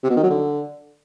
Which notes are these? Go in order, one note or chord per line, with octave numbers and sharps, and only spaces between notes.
C3
B2
D#3
F#3
D3